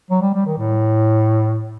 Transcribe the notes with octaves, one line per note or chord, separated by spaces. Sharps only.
F#3
G3
G3
D#3
A2